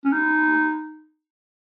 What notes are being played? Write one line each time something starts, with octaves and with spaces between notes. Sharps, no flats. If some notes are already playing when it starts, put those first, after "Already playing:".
C#4
D#4